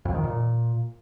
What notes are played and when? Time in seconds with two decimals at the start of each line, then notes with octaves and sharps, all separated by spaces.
0.05 F2
0.15 D#3
0.24 A#2